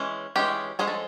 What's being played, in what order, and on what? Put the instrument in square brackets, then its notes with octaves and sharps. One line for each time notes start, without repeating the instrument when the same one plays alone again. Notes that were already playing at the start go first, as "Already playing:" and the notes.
Already playing: [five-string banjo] E3 G#3 C#4
E3 G#3 C#4 G4
F3 G#3 C#4 G#4
A4